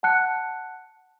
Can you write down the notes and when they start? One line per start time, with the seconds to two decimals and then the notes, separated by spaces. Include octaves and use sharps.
0.03 F#5 A5 F#6 C#7